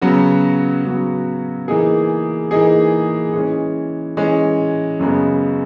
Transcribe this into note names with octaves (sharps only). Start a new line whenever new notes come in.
C#3 F#3 B3 F#4
C#3 F#3 B3 F#4
E3 A#3 D#4 G#4
E3 A#3 D#4 G#4
E3 G#3 C#4
E3 G#3 C#4
F#2 C#3 G#3 B3